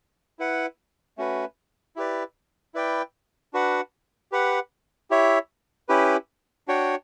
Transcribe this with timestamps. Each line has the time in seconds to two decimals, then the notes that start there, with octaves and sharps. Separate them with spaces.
0.39 E4 B4 F#5
1.18 A3 C#4 F#4 B4
1.96 E4 G4 B4 D5
2.74 E4 B4 D5 G5
3.53 D4 F#4 B4 F#5
4.32 G4 B4 F#5
5.10 E4 G4 C#5 E5
5.89 C#4 E4 G4 B4
6.68 D4 F#4 C#5 G5